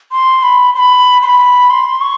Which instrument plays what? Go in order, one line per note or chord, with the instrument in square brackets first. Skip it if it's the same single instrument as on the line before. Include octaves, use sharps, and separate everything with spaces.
[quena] C6
B5
C6
B5
C6
B5
C6
C#6